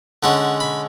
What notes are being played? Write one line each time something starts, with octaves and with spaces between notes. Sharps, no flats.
D3 G#3 C#4 F#5
B5